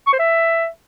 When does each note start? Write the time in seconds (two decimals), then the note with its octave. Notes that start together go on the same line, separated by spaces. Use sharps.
0.07 C#6
0.13 C5
0.19 E5